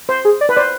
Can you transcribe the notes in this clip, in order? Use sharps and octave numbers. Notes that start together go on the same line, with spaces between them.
C5
G#4
D5
B4
C5 D5